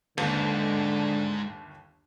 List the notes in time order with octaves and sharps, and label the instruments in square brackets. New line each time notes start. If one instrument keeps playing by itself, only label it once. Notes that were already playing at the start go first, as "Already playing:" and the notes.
[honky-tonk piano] G1 D#2 [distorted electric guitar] G#2 [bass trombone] D3